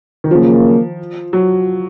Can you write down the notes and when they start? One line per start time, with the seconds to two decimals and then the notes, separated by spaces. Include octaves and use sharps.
0.24 D#3
0.31 C#3 F3 F#3 A#3
1.33 F#3